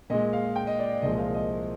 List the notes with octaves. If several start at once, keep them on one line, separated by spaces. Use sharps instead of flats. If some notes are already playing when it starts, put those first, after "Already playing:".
A#2 G#3 D#5
F5
G5
D#5
D5
C2 A#2 F3 G#3 D#5
F5
D#5